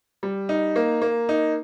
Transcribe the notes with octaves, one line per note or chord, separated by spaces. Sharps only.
G3
D#4
A#3
A#3
D#4